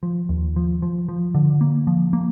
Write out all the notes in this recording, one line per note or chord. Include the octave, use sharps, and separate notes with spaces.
F3
D#2
F3
F3
F3
D3
A#3
F3
A#3